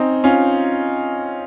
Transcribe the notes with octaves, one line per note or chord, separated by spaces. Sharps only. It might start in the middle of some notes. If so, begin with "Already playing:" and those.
Already playing: C4 C#4 D#4
C#4 F4